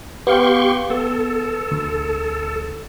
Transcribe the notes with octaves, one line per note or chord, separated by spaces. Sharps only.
B3 G4 F5 G5 C6 C#6
B3 A4
D2